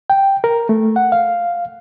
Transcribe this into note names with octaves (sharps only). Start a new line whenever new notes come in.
G5
A#4
A3
F#5
F5